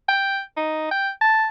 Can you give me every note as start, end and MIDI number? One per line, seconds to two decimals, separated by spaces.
0.08 0.41 79
0.57 0.88 63
0.91 1.10 79
1.21 1.48 81